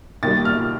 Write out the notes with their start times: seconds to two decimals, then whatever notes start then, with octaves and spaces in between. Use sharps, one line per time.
0.23 D#2 D#3 G3 A6
0.45 F6